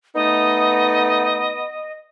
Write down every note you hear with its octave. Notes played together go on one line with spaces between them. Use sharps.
A3 B3 D#4 D#5